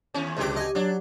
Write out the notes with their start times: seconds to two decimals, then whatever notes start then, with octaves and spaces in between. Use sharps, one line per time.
0.14 D#2 C#4
0.37 C#2 B2 D3 G4 D6
0.56 D#5 G#5
0.75 F#3 D4